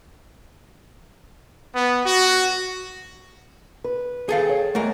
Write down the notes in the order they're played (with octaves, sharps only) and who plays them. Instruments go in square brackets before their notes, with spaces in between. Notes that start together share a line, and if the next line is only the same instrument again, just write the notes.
[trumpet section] B3
F#4
[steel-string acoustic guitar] B4
[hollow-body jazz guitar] G#4 A4 F5
[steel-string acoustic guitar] C#5 G5
[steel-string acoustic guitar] E2 G#3 F#5 [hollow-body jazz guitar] A3 A#4